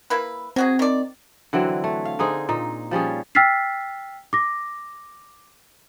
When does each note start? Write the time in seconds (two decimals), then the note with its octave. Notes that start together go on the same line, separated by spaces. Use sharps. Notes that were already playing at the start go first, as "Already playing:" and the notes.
0.10 A#3 E4 B4
0.56 F#3 C4 F#4 G#4
0.79 D#3 D5
1.53 D3 E3 F#3 C4
1.84 A3
2.05 F5
2.19 D3 D#4 G#4 C5
2.49 A#2 D#4
2.91 F3 G3 C#4 G#4
3.35 G5 E6 F6 A6 B6 C7
4.33 D6 A#6